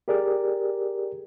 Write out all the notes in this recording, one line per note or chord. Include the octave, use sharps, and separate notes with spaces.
G4 G#4 A#4 D5